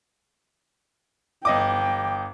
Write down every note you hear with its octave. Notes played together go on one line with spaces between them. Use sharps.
G1 D#5 G5 D6